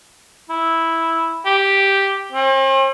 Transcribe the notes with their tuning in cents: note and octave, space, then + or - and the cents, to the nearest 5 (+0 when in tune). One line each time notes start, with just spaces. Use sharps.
E4 -5
G4 +0
C4 +45